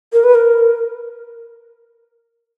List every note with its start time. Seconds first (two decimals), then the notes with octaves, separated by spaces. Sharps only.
0.13 A#4
0.24 B4
0.35 A#4